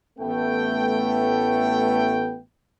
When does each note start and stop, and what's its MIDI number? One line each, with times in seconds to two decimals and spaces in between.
0.19 2.38 33
0.19 2.38 57
0.19 2.38 59
0.19 2.38 79